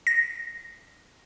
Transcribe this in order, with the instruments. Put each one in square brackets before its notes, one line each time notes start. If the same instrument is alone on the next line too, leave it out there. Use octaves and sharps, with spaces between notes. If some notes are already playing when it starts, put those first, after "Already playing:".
[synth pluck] A#6